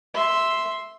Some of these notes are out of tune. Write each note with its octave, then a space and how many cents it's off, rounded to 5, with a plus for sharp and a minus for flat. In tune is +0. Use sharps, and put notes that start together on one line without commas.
E5 +0 C6 +0